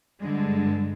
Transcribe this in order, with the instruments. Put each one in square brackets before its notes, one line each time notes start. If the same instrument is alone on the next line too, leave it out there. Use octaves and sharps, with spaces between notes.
[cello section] G2 D3 G#3